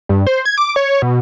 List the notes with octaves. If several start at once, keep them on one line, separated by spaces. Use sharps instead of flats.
G2
C5
G#6
D6
C#5
B2